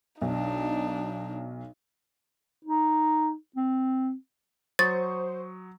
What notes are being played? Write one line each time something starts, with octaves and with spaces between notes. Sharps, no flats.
B1 D4 D#4
D#4
C4
F#3 C5 C#6 D#6 A6